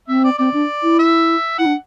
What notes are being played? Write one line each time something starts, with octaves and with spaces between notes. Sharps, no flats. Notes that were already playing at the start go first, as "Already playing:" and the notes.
C4 E5
D5
C4 D5
D4
E4
E5
E4 F#5
D4